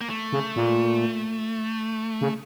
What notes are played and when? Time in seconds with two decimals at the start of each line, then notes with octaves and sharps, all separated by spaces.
0.01 A#3
0.09 A3
0.32 C#3
0.56 A#2
2.21 C#3